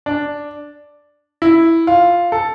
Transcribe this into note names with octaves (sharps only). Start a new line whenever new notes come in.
D4
E4
F4
A4